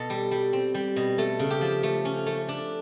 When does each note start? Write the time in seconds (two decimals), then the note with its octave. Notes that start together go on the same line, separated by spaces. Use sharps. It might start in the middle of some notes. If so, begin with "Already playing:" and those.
Already playing: B2 A4
0.10 G3
0.31 G3
0.53 C4
0.74 G3
0.96 B2
1.18 A3 A4
1.39 C#3
1.50 G4
1.61 F3
1.83 A3
2.05 C#4
2.26 A3
2.49 D4